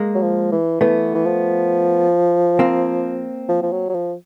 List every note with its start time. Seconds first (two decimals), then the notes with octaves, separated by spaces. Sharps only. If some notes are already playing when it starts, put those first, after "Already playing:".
Already playing: G#3 A#3
0.15 F#3
0.22 F3
0.52 E3
0.81 E3 A3 B3
1.14 E3
1.25 F3
2.59 A#3 C4
3.49 F3
3.62 F3
3.72 F#3
3.89 F#3
3.94 F3